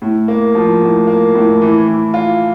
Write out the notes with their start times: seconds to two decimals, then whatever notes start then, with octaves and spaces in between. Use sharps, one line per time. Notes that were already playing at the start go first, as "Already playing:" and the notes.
0.02 A2
0.28 A#3
0.55 F3
0.82 A2
1.07 A#3
1.35 A2
1.62 E3
1.88 E3
2.14 F4